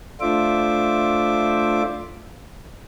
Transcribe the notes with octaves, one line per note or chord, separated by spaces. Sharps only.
A3 D4 F4 C5 E5 D6